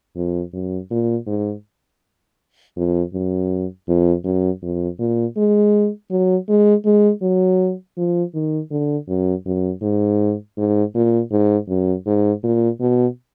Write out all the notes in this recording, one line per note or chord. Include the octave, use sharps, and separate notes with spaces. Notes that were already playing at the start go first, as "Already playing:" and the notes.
F2
F#2
A#2
G#2
F2
F#2
F2
F#2
F2
A#2
G#3
F#3
G#3
G#3
F#3
F3
D#3
D3
F#2
F#2
G#2
G#2
A#2
G#2
F#2
G#2
A#2
B2